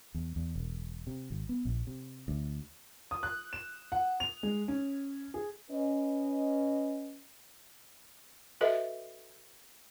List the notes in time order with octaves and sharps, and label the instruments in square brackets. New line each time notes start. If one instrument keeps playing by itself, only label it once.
[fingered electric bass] E2
E2
E1
C3
G#1
B3
A#1
C3
D2
[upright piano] D#6
F#6
E7
F#5
F7
G#3
C#4
G#4
[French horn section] C#4 B4 D#5
[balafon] F#4 A4 B4 D#5 E5